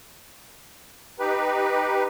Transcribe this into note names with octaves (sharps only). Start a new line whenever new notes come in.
D#4 G4 B4